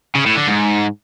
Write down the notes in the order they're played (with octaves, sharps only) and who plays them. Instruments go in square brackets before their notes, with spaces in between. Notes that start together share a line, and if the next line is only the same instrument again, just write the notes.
[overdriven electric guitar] C#3
A2
D3
G#2